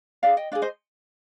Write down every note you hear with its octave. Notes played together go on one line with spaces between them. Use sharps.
D4 G#4 D5 F5
D#5 G5
D4 G#4 D5 F5
C5 D#5